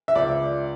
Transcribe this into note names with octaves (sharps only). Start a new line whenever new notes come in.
E5
C#2 D5